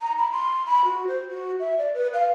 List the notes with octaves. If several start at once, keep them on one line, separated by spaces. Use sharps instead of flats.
A#5
B5
C6
B5
F#4
C5
F#4
E5
D5
B4
F5